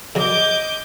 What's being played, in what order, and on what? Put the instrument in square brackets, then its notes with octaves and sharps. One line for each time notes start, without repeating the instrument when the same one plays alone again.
[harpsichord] C#3 F#3 [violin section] D#5 D6 G6